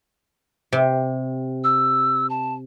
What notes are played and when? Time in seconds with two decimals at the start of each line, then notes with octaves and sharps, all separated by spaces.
0.72 C3
1.64 E6
2.30 A5